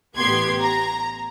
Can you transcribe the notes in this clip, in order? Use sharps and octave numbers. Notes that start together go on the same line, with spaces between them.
A1 B3 G4 C6 G#6
A#5